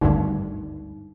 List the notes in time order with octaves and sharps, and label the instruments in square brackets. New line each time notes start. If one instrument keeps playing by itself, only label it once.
[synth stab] G#1 D2 G2 [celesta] D#4